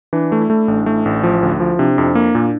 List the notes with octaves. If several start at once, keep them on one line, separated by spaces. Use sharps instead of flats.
E3 D4
A3
E4
A3
A1 D4
A3
E4
A1
F3 E4
D2
F3
C3 D4
F2
A#3
A#2